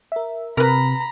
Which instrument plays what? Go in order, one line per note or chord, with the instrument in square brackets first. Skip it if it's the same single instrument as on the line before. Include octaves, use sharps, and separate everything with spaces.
[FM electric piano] A#4 E5
[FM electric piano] C3 [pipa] A#4 B4 [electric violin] A#5 B5